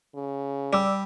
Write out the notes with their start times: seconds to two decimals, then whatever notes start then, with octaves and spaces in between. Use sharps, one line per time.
0.15 C#3
0.73 G3 D5 D6 E6